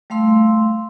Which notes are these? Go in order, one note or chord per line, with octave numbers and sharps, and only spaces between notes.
G3 A3 F5 C6 E6